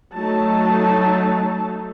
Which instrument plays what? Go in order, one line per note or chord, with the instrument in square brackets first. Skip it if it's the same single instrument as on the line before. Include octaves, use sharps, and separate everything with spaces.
[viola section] F#3 A3 D#4 A5